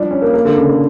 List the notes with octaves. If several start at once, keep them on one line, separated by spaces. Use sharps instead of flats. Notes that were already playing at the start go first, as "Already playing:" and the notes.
Already playing: F3 G3 D4
C#4
A#3
A#3
D3
C#3
D3